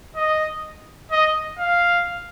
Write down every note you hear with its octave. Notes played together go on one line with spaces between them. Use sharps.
D#5
D#5
F5